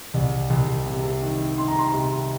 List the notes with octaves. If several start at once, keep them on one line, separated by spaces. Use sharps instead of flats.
C2
C2
C3
D#3
D#3 C6
A#5
C6
C3